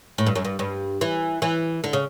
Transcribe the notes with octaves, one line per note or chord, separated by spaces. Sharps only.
A2
G2
F#2
G2
G2
E3
E3
D3
C#3